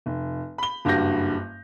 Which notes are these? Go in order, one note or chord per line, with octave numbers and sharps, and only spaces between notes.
F1
B5 G7
F#1 G2 G3 F#4 G6 A#6